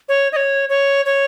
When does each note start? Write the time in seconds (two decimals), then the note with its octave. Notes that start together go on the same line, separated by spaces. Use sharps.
0.09 C#5
0.32 D#5
0.36 C#5
0.69 C#5
1.06 C#5